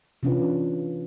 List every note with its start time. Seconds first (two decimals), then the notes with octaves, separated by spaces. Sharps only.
0.23 C3 E3 C#4 D4 F4 B4